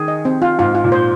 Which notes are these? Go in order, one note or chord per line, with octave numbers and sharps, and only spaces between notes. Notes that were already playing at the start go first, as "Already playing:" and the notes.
Already playing: D#3 G#4
D#5
C4
F4
G#2 F4
F4
A#2
C5